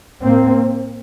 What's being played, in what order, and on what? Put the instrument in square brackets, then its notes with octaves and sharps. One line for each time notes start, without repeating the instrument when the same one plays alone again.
[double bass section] A2 A#3 C4